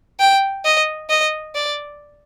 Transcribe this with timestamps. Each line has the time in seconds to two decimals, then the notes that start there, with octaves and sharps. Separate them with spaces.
0.20 G5
0.65 D#5
1.10 D#5
1.55 D5